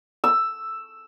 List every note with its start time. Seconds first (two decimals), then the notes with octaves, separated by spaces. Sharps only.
0.24 E6